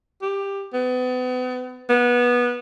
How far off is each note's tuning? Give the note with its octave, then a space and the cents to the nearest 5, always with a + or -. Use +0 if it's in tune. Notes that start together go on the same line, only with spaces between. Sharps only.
G4 +15
B3 +35
B3 -20